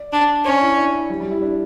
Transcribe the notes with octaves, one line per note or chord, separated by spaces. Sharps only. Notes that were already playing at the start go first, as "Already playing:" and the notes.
Already playing: D5
D4
C#4 D5
E4
D4
E4
G3
G3
E4
D4